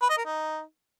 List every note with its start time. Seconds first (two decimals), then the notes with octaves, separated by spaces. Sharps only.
0.02 B4
0.10 D#5
0.18 A#4
0.25 D#4